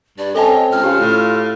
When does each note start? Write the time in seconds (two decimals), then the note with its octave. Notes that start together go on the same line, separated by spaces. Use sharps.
0.18 G2 D5
0.35 C4 C#4 A4 D#5 A5
0.71 C#2 F6
0.83 C#3 F4 G4
0.99 A2